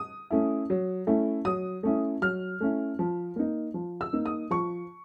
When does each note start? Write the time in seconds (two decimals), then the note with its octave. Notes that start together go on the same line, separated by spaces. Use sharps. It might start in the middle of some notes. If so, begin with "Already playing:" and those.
Already playing: D#6
0.30 A3 C#4 E4
0.70 F#3
1.07 A3 C#4 E4
1.45 F#3 D#6
1.83 A3 C#4 E4
2.22 F#3 F6
2.60 A3 C#4 E4
2.99 F3
3.36 A#3 D#4
3.74 F3
4.01 E6
4.13 A#3 D#4
4.26 D#6
4.51 F3 C#6